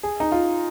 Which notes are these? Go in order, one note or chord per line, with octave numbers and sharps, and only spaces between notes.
G#4
D#4
F4